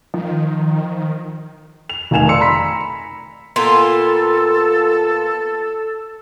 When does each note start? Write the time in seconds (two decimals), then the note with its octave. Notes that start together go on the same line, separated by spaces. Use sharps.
0.14 D#3 F3
1.90 F7
2.11 F1 D#3 F5 G#5 E7 F7
2.29 D5 C6 E6 C#7
2.41 A#5 B5 B6
3.56 A#2 B3 F4 A4